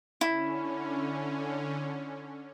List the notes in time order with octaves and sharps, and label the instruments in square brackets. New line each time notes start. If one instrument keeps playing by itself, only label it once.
[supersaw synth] D3 C#4 [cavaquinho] E4